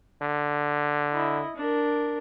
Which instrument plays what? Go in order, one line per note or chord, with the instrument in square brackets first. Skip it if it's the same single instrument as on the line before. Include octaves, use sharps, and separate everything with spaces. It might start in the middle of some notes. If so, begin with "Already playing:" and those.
[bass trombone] D3
[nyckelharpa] E4 D#5
D4 A#4